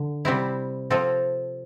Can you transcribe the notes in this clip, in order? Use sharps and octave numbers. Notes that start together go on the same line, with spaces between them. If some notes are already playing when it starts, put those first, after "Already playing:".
Already playing: D3
C3 G3 C4 E4
F3 C4 F4 A4